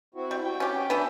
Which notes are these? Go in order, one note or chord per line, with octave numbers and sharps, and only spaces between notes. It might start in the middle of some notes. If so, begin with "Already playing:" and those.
C4 E4 F#4
G3
F#4 G5
C#4 G4
E3 B3 D4 B4